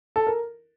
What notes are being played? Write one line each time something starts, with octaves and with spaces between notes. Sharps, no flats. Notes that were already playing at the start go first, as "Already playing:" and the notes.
A4
A#4